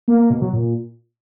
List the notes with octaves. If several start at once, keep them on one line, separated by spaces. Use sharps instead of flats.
A#3
A#3
B2
F#3
A#2